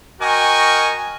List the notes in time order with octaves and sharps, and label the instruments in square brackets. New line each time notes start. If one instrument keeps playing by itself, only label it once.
[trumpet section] F#4 A#4 D#5 G5 G#5 C#6